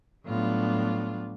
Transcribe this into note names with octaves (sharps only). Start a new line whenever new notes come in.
A2 F#3 G3 B3 D4 F4